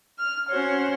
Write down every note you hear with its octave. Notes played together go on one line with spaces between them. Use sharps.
F6
C#4 F#4 C5 C#5